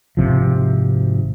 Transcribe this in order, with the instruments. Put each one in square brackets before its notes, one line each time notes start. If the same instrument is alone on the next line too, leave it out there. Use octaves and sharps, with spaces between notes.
[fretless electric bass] G#1 C#2 C3 F3